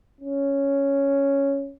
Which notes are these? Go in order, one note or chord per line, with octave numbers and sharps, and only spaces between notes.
C#4